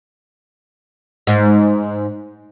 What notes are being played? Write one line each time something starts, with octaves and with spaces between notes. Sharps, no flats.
G#2